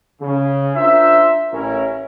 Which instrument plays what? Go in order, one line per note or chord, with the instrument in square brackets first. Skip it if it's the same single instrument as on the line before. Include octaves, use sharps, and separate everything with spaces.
[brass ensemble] C#3
D4 F4 A#4 C5 E5
A1 C#4 E4 A#4